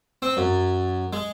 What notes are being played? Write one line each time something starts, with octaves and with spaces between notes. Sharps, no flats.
C4
F#2
G#3